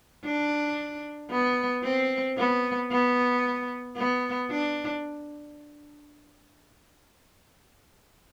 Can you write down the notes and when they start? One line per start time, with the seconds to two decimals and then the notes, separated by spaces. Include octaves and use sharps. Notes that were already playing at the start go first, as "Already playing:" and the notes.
0.25 D4
1.31 B3
1.84 C4
2.37 B3
2.91 B3
3.97 B3
4.51 D4